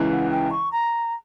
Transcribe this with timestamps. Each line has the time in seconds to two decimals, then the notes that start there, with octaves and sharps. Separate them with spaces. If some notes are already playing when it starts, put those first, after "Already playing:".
Already playing: C#2 C#3 E3
0.10 F#5
0.30 G5
0.50 C#6
0.71 A#5